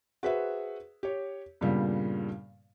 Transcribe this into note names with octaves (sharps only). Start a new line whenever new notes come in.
F#4 G#4 B4 C5 E5
G4 C#5
G2 A#2 C#3 G3 B3